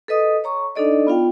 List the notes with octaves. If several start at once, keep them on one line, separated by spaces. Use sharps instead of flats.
A4 B4 D#5 D#6
C#5 A#5 C#6
D4 D#4 A4 D5 D#5
B3 F4 F5 G5